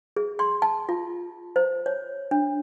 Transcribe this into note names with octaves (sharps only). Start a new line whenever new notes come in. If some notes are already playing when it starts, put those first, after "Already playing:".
G#4
C6
A5
F4
C5
C#5
D4